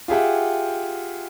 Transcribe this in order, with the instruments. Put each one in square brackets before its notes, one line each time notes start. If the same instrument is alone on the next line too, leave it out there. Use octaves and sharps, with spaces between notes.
[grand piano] F4 G4 G#4 E5 F#5 G5